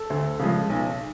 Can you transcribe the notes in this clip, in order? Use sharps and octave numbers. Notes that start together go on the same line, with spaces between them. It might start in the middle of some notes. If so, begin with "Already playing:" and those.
Already playing: A4
D2
C#3 F3 G#3
B1